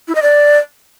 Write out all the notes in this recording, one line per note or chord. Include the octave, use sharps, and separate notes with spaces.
E4
D#5
D5